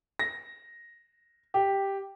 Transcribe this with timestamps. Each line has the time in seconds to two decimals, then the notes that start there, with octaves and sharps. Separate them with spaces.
0.19 A#6
1.54 G4